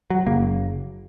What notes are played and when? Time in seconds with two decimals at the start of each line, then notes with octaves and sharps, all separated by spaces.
0.10 F#3
0.26 F#1 F#2 C#3 A#3